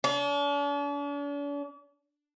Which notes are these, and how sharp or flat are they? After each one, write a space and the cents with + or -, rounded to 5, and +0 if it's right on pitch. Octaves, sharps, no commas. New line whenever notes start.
D4 -45